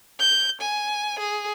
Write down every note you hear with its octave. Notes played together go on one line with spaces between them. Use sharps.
G6
G#5
G#4